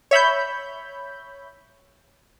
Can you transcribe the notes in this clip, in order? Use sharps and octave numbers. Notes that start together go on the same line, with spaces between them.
C#5 E5 B5 G6